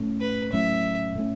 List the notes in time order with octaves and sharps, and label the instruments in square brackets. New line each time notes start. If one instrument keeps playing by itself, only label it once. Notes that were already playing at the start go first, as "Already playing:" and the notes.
Already playing: [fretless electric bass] A2 A3 C#4
[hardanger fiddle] B4
[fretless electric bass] A2 F#3 A3 C#4 [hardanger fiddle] E5
[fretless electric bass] A2 A3 C#4